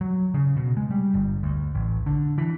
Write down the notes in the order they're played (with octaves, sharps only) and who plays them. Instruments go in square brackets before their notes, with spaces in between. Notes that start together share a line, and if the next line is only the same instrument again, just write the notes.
[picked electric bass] F#3
C#3
B2
G#3
G3
G1
D2
A1
D3
E3